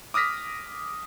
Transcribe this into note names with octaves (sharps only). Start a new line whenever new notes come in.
D6 D#6 F6 A#6 B6